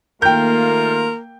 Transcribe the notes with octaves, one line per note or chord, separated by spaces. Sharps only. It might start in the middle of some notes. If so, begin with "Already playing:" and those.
D#3 A3 A#3 F4 A#4 G5 G6